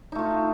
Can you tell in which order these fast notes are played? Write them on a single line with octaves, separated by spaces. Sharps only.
D#4 A3 F4